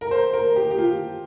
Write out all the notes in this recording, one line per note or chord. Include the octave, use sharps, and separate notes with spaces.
A#4
C5
A#4
G4
G4
F4